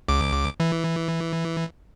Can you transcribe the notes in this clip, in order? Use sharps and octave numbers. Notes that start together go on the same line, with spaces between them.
C#2 D6
E3